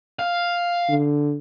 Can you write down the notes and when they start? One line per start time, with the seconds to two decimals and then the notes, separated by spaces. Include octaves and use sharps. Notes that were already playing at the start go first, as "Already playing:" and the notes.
0.19 F5
0.89 D3